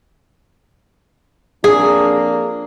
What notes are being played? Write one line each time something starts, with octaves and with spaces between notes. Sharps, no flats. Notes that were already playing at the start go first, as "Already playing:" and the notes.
F2 A#3 D4 G#4